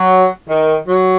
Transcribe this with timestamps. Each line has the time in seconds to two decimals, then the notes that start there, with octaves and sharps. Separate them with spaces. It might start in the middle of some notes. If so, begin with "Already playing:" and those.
Already playing: F#3
0.49 D#3
0.87 F#3